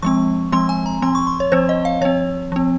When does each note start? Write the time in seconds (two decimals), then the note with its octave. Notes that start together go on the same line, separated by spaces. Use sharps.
0.02 F3 G#3 C4 C#6
0.52 F3 G#3 C4 C6
0.69 G#5
0.86 A#5
1.02 F3 C4 C6
1.15 C#6
1.27 C6
1.40 C#5
1.52 F3 C4 C5
1.69 D#5
1.85 F5
2.01 F3 C4 C#5
2.52 F3 C4